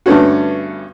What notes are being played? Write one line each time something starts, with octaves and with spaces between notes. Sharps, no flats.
G2 D3 A3 B3 C#4 F#4